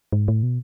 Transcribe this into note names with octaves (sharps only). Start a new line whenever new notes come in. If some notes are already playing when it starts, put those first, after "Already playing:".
G#2
A2
B2